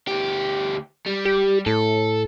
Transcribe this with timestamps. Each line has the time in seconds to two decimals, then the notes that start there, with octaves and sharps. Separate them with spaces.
0.07 D2 G4
1.06 G3
1.25 G4
1.66 A2 A4